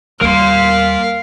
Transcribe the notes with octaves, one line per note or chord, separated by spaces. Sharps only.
D#2 G3 A#4 F5 C6